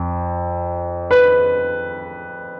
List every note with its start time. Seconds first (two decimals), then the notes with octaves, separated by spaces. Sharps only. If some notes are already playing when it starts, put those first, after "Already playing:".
Already playing: F2
1.11 B4